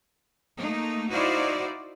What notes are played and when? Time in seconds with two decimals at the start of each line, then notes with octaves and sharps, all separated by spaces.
0.57 A3 A#3 D#4
1.11 D#4 E4 F#4 C5 D5 F5